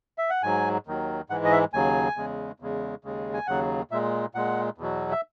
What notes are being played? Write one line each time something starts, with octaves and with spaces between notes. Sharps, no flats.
E5
F#5
G#2 F#3 G#5
D#2 D#3 F#3
G#2 E3 G#3 F#5
D#5
E5
D#2 C#3 F#3 G#5
E2 C#3 G#3
E2 C#3 G#3
D#2 C#3 G#3
G#5
D#2 C#3 F#3 F#5
A#2 G#3 E5
A#2 G#3 F#5
E2 B2 F#3
E5